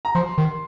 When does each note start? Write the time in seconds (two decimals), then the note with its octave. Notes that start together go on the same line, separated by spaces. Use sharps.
0.05 A#5
0.15 F3 C6
0.38 D#3